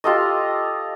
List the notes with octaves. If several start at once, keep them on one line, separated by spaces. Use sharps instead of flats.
F4 G4 A4 D#5